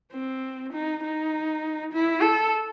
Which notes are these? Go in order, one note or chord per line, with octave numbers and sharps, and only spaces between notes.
C4
D#4
D#4
E4
A4